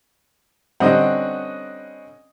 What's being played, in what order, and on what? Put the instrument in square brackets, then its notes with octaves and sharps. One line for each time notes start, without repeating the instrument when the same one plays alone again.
[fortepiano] D3 G3 C4 [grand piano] C#4 D#5 F#5